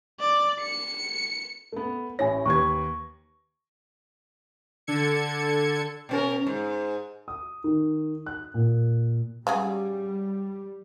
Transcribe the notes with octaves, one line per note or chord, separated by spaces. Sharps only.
D5
C#7
A3 B3
A1 E4 C#5 G#5 A#6
D#2 B4 C#6 G#6
D3 A4 G#6 C#7
B2 C#4 A#4
G#2
D#6
D#3
F#6
A#2
C#3 F#3 G3 G#4